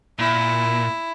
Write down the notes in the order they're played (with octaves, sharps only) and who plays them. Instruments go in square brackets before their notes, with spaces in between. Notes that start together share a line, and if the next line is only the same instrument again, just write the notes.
[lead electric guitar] A#2 [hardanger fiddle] E4